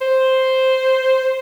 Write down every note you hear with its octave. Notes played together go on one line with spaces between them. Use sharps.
C5